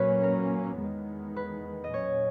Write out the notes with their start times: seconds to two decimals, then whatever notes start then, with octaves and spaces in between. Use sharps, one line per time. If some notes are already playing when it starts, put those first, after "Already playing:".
Already playing: A#2 F#3 A#3 C#4 B4 C#5
0.23 A#4
0.79 E2 D#3 G#3 B3
1.36 B4
1.84 D#5
1.94 A#2 F#3 C#4 C#5